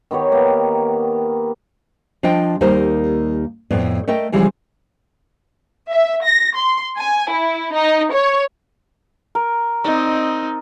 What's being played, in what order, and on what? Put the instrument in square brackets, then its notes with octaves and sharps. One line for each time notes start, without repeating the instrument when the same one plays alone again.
[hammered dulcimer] D#3 B3 G4 C#5
A#3 B3
[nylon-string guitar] F3 D4 F4 D#5 G5
D#2 G3 A#3 D#4 A#4 C5
F2 A2 B3 D5
A3 A#4 D#5 G5
C#3 E3 F3 G3 G#3
[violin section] E5
A#6
C6
G#5
E4
D#4
C#5
[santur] A#4
[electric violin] C4 D#4 [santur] D5 D#5